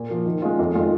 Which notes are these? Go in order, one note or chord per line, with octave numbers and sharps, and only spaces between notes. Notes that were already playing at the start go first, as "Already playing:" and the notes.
Already playing: A#2
F3 A#3
D#3
G#3 C#4 F4
F2
D#3 G#3 F4